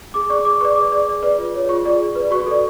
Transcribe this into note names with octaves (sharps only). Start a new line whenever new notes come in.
G#4 D6
D5 C#6
G#4 D6
B4 D5 C#6
G#4 D6
D5
G#4
B4 D5
F4
G#4 C#5
F4 C#6
G#4 D5
G#4
B4 D5
F#4 C#6
A4 D5